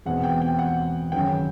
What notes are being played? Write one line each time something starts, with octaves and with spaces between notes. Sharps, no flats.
E2 B2 G#3 C4 F#5
G5
G5
F#5
G#1 F#2 C#3 G5